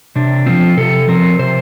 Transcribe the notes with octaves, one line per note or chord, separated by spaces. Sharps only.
C3 D4
F3 C4 F4
C3 A4
F3 C4 A#4
C3 C5